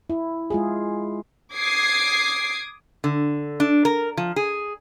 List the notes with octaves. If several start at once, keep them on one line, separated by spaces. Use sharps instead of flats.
E4
G#3 F4 G#4
D6 D#6 G#6 C7
D3
D4
A#4
F3
G#4